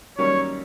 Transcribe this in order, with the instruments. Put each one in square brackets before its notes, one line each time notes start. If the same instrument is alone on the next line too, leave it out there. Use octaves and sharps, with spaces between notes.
[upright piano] F#2 D#3 G3 A#3 C#4 [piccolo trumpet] C#5